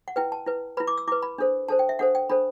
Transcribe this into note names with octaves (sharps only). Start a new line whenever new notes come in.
F#5
E4 B4 G5
A5
E4 B4
E4 B4 B5
D6
E6
E4 B4 D6
B5
D4 A4 C5
D4 A4 C5 A5
G5
E5
D4 A4 C5 F#5
G5
D4 A4 C5 B5